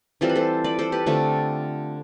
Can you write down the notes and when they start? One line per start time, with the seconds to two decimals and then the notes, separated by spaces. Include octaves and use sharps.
0.21 E3 G3 C4 F4 A4
0.29 B4
0.35 A4 C5
0.64 B4 D5
0.79 A4 C5
0.92 G4 B4
1.06 D3 A3 C4 F4 A4